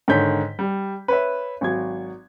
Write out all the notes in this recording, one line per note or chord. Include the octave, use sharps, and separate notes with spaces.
G#2 D3 D#3 C#5 G6 B6
G3
B4 C#5 E5
G#1 F#3 G#6